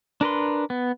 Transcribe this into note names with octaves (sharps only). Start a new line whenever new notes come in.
D4 A#4 B4 C6
B3